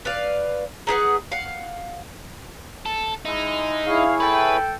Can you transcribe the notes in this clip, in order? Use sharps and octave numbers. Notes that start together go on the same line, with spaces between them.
B4 D5 F5
D#4 G#4 B4 F#5
F5 F#5
A4
G#3 D#4 E4
E4 G#4 C#5 F5
A4 B4 G5